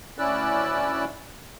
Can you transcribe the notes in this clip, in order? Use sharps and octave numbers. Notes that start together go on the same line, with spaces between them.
D2 C#4 E4 D5 E6 F#6